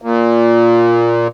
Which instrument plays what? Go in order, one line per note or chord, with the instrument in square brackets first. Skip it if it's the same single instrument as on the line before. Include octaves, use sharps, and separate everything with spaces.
[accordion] A#2